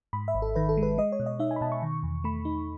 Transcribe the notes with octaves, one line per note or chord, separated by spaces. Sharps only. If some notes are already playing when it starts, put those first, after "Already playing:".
G#2 B5
E5
G#1
A4
D#3 B4
A4
G#3
B4
G#3 D#5
C#5
B2
D#5
D#4 E5
G#5
B5
B2 A5
C#6
D#3
E2
A3 B5
D#4